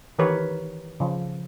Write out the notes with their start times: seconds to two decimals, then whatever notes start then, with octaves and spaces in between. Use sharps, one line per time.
0.19 D#3 E3 G4 A#4 B4 C#5
1.00 C#3 F3